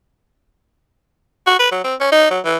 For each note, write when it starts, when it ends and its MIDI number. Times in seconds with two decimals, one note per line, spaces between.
1.47 1.55 66
1.59 1.68 71
1.71 1.82 54
1.84 1.95 60
2.00 2.11 61
2.12 2.28 63
2.30 2.40 54
2.45 2.57 52